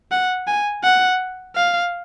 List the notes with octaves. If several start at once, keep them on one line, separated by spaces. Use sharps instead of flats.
F#5
G#5
F#5
F5